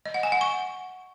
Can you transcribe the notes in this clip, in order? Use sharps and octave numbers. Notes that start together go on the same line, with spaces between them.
D#5
F#5
G#5
F#5
C#6